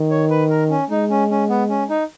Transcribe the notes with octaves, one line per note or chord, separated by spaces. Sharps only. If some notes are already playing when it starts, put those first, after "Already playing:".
Already playing: D#3
C#5
B4
A#4
C#4
G#3 D#4
C#4
C#4
B3
C#4
D#4